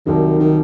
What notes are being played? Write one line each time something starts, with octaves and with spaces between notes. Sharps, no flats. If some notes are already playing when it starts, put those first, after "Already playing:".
C2 C3 D#3 F#3
D#3